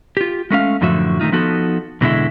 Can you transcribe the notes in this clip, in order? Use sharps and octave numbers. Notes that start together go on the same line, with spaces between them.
F4 G4
G#3 A3 C#4 F5
F#2 A2 D3 F3 F#4 E5
D#3 A3 D#4 F4
F3 B3 D#4 F#4 A4
E2 B2 D3 G#3 E4